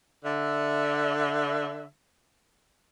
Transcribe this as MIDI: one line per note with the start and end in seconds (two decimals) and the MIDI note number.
0.25 1.85 50
0.25 1.85 76